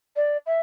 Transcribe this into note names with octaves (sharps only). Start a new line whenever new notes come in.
D5
E5